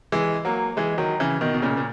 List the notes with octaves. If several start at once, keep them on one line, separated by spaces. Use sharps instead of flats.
E3 G#3
F#3 A#3
E3 G#3
D#3 F#3
C#3 E3
B2 D#3
B2
A#2 C#3
A#2